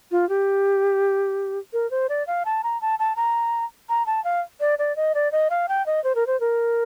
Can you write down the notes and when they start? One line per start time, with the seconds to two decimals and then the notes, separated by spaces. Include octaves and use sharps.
0.11 F4
0.29 G4
1.73 A#4
1.91 C5
2.09 D5
2.27 F5
2.45 A5
2.63 A#5
2.81 A5
2.99 A5
3.16 A#5
3.89 A#5
4.06 A5
4.24 F5
4.60 D5
4.79 D5
4.96 D#5
5.15 D5
5.32 D#5
5.50 F5
5.68 G5
5.86 D#5
6.04 C5
6.15 A#4
6.27 C5
6.40 A#4